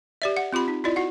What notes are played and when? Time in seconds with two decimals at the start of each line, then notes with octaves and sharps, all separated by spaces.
0.22 G4 D5 E5
0.37 F#5
0.53 C4 F4 G4 B5
0.68 D#4
0.84 E4 F4 D5 D#5
0.96 F#4 F#5